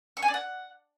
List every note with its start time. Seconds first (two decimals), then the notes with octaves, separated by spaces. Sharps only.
0.17 C#6
0.22 G#5
0.28 D5
0.34 F#5